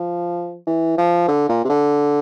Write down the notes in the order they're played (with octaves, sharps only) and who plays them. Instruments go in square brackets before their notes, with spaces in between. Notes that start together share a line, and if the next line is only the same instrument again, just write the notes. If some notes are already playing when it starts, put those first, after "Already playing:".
Already playing: [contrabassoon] F3
E3
F3
D3
A#2
C3
D3